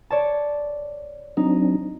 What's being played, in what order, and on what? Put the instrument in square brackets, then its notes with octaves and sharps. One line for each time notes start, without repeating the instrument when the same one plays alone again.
[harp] C#5 D5 A5
[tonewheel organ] F#3 C4 D4 [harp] D#4